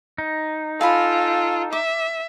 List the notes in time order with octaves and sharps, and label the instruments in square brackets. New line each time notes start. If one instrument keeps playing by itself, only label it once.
[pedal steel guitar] D#4
[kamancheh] F4 [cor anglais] A4 [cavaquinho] F5 G#5 B5
[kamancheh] E5 [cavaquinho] D6